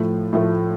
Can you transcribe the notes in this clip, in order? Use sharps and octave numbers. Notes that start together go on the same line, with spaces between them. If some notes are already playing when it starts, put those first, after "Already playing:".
Already playing: A2 F3 A3
A2 F3 A3